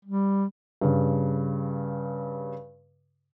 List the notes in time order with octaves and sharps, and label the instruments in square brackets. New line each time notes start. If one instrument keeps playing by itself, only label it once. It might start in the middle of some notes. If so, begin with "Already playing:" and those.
[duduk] G3
[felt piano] G2 C#3